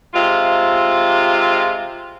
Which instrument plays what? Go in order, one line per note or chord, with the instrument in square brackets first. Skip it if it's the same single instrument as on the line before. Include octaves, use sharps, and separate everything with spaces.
[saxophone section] C3 G#3 F4